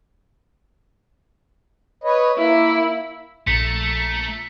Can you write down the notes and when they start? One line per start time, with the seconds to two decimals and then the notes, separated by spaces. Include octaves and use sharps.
2.04 B4 C#5 D#5
2.38 A#3 E4
3.47 A#1 A3 A#5 A6 B6 C#7